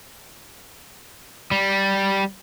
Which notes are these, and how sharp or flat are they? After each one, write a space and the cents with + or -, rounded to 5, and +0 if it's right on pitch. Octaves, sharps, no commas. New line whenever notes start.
G3 -5